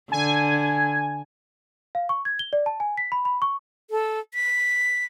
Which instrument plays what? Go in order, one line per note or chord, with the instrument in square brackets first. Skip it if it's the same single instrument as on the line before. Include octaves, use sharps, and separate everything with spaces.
[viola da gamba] D3 [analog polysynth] G#5
[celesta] F5
C#6
G#6
G7
D5
A5
G#5
B6
B5
B5
C#6
[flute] A4
B6